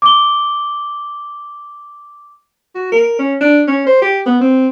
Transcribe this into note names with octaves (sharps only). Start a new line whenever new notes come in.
D6 G7
F#4
A#4
C#4
D4
C#4
C5
G4
B3
C4